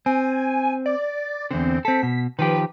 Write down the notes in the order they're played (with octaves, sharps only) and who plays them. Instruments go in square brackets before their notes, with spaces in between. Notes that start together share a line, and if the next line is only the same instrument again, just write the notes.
[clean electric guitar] C4 [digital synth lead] G#5
[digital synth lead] D5
[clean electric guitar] E2 D3 [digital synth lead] C4
[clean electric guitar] C4 A4 [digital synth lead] B6
[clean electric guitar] B2
[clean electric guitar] D#3 F3 G4 [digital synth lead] B4